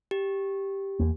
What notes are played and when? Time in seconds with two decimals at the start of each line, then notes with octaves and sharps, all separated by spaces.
0.11 G4
1.00 E2 A#3